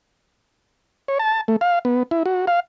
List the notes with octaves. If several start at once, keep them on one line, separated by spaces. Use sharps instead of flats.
C#5
A5
A3
F5
B3
E4
F#4
F5